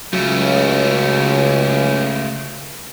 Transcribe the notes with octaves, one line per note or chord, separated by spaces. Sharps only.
C#2 C#3 F#3 A3